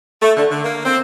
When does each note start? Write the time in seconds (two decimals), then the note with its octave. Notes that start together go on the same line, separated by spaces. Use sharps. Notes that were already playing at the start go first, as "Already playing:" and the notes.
0.21 A3
0.37 D3
0.50 D3
0.64 A#3
0.85 C4